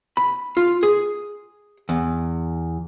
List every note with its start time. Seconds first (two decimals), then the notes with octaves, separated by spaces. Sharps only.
0.17 B5
0.57 F4
0.83 G#4
1.89 E2